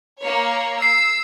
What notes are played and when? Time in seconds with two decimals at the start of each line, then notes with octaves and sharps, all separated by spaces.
0.22 A#3 C#5
0.82 E6 C7